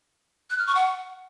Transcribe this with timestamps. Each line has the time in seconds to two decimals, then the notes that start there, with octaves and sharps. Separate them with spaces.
0.50 F#6
0.58 F6
0.67 C#6
0.75 F#5